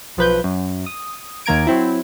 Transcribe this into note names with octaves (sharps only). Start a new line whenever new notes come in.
B1 F3 B4 G6
F#2
D#6
D#2 D#3 A#3 A#5 G#6 D7
F#3 C4 E4